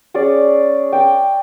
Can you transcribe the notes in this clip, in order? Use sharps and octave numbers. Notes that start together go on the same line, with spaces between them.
C#4 G#4 D5
G5 D6